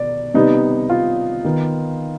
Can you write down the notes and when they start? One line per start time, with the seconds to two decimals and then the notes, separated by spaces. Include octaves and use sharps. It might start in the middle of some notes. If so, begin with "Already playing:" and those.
Already playing: B2 B3 D5
0.34 C3 G3 B3 D#4
0.90 F4
1.45 D#3 B3